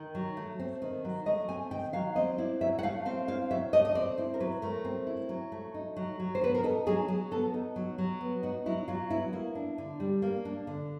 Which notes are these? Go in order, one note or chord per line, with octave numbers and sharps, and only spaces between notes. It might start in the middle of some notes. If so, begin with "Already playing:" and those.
Already playing: D#3
F#3
A3
C4
D#3
F#3
A3 D#5
C4 G#5
D#3 G5
F#3 F5
C4 D#5
E4 D5
F#3 E5
F#5
A3 F5
C4 F5
E4 F5
F#3 E5
A3 D#5
D#5
C4 D5
E4 C5
A#4
F#3 B4
A3 A#4
C4
E4
F#3
A3
D#4
F#3
F#3
C5
B3 B4
A#4
D#4 A4
F#3 G#4
F#3 G#4
B3 A4
D#4
F#3
F#3
B3
D#4 F#4
F#3 E4
F#3 F4
B3 E4
A#3 E4
D4
D3
G3
A#3
D4
D3